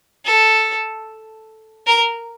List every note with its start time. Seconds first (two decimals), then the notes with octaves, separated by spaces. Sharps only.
0.25 A4
1.87 A#4